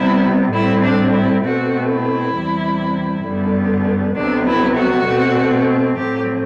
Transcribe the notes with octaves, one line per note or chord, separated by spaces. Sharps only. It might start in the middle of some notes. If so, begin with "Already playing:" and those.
Already playing: C3 G3 B3 E4
A2 G3 C4 E4
D4
E4
B2 A3 C4 F#4
E4
E2 C3 G3
F#2 D3 G3 B3
D2 C3 F#3 B3 D4
E4
F#4
B2 A3 C4
A2 F#3 A3 C4 G4